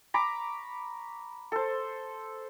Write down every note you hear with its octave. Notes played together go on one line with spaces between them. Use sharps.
A#5 B5 C#6 D6
A4 C5